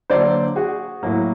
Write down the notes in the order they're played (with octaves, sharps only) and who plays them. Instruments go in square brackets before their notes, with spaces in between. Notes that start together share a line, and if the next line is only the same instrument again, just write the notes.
[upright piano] D3 F#3 A#3 C5 D5
F#4 G#4
A2 F#3 A#3